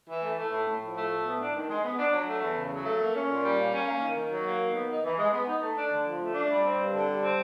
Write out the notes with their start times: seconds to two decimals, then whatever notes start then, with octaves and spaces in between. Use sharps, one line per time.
0.08 E3
0.23 A3
0.37 A3
0.51 A2
0.66 A2
0.81 F3
0.95 A3
1.10 A2
1.24 B3
1.39 D4
1.53 D#3
1.68 G#3
1.83 B3
1.98 D4
2.12 F#3
2.27 A3
2.41 E2
2.55 C#3
2.70 F#3
2.85 A3
2.99 A#3
3.14 C#4
3.29 A#2
3.42 G3
3.57 A#3
3.72 C#4
3.86 A#3
4.01 D#3
4.15 D#3
4.31 F#3
4.45 A#3
4.60 D#3
4.73 B3
4.89 D#4
5.04 E3
5.17 G#3
5.32 B3
5.47 D#4
5.62 A3
5.76 D4
5.90 D3
6.05 F3
6.19 A3
6.34 D4
6.49 G3
6.63 C4
6.78 G2
6.92 D3
7.08 G3
7.22 C4